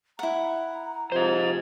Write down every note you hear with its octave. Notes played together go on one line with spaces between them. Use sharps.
E4 F#5 A#5
C3 F3 C5 D#5